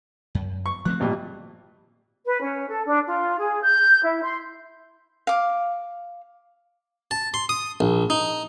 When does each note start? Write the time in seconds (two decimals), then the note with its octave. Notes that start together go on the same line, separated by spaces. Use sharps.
0.35 F#2
0.66 C#6
0.85 F3 A3 C4 F#6
1.00 G#1 A#2 G3
2.25 B4
2.40 C#4
2.68 A4
2.87 D4
3.06 F4
3.38 G#4
3.62 G6
4.03 E4
4.23 C6
5.27 F5 D6
7.11 A5
7.34 C6
7.49 D#6
7.80 A#1
8.10 D#4